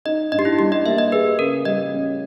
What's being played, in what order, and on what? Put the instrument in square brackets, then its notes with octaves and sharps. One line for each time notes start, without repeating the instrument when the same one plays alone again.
[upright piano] D#4 [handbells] D#5
[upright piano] G2 [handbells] D#5
[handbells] G4
E4
[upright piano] G3 [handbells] G4
[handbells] D#5
[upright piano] A#3 [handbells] E5
[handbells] D#5
[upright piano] G#4 [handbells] B4
[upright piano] C#3 [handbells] A#4
[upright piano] G3 [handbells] D#5
[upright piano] C#4